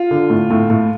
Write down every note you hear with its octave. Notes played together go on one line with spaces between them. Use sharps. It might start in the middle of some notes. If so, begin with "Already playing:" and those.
Already playing: F4
D3
A2
A2
A2